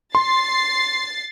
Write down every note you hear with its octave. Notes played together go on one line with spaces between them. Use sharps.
C6 A6 C7